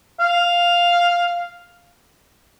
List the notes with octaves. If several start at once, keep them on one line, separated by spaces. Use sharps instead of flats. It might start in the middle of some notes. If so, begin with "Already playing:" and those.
F5